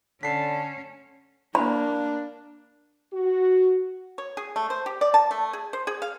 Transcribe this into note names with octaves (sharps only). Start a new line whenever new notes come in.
D3 C#4 A5 B6 C7
A#3 D4 B5
F#4
C#5
G#4
A3
C5
G4
D5
A5
A3
G#4
C5
G#4
F5